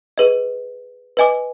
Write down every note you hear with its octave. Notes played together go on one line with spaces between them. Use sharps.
G#4 B4 D#5
B4 D#5 G#5 D6